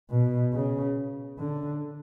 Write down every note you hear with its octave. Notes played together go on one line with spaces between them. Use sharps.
B2
C#3
D3